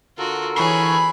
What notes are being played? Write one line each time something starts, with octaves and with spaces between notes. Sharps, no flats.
D3 F4 F#4 A4 A#4
E3 G#4 C#5 B5 C#6 C7